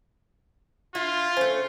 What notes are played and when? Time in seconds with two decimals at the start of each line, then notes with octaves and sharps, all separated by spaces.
0.95 E4 F4
1.37 A3 C#4 C5